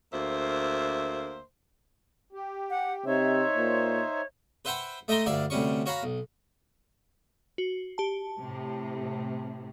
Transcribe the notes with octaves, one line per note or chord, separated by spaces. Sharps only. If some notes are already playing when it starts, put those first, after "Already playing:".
D2 A#3 C5 E5
G4
F#5
C3 D#4 C5 C#5 E5
A#2
B4 C5 E5 F#5 G5 B5
A3 D#5 E5 G5 A#5 C6
D2 G2 D5 E5 F5
D2 C3 G3 C#4 C#6
F#4 C#5 F5 A#5 B5
B1
F#4
G4 A5
A2 C3